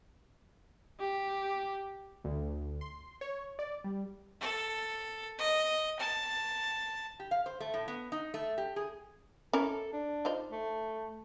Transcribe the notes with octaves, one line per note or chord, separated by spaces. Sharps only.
G4
D2
C6
C#5
D5
G3
A4
D#5
A5
G4
F5
C5
A3
A2
B3
D#4
A3
G4
G#4
C#4 E4 A4 A#4
D4
D#4 F4 C5
A3